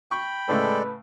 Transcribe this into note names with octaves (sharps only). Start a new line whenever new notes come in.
G5 B5 C#6
A2 C#3 G#3 A3 A4 B4 D5